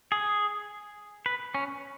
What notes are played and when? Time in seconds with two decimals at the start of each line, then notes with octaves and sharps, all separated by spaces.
0.12 G#4
1.26 B4
1.55 C#4